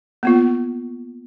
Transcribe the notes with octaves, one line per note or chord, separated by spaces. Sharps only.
A#3 B3 F4